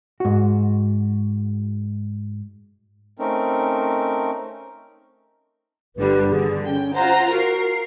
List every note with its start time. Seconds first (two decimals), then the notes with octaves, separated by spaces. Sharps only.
0.20 G#2 F#4
3.19 A3 C4 C#4 D#4 A#4
5.96 G1 D3 G3 B4
6.30 D3 G#4
6.66 C#4 G5
6.95 F4 C5 F#5 A#5
7.31 F#4 A#4 C7